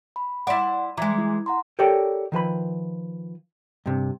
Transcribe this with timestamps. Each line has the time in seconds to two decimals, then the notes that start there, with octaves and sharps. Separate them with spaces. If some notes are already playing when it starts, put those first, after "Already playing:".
0.16 B5
0.47 E4 D5 F#5 C6
0.97 E3 G#3 A#5 D6 G#6
1.18 E4
1.46 F#5 A#5 C6
1.79 G4 A4 A#4 C#5 D5 G5
2.32 D#3 F3 B4 B5
3.86 G2 C3